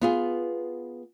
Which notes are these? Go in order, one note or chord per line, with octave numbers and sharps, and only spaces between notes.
B3 F4 G#4